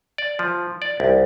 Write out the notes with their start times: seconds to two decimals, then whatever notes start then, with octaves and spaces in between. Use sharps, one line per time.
0.18 D5
0.39 F3
0.82 D5
1.00 C2